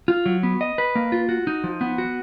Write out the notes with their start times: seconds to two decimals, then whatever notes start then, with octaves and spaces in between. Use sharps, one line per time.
0.08 F4
0.26 F#3
0.43 B3
0.61 D#5
0.78 B4
0.95 A#3
1.12 F4
1.29 F#4
1.47 D#4
1.64 F3
1.81 B3
1.98 F#4